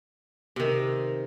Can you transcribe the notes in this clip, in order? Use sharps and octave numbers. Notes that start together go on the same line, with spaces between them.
C3 D#3